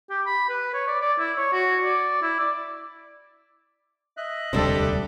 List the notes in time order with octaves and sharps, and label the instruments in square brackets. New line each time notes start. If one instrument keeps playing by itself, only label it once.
[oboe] G4
B5
B4
C#5
D5
D5
E4
C#5
F#4
D5
E4
D5
[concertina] D#5 E5 F#6
[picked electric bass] E1 D2 C3 [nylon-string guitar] G3 D4 C5 [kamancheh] G4 A4